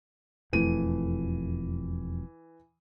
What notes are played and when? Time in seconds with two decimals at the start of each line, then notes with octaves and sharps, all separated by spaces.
0.53 E1 F2 E3 A3 D#7